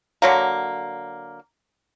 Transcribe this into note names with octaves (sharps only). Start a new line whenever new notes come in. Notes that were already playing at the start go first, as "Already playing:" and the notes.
D3 F#3 A#3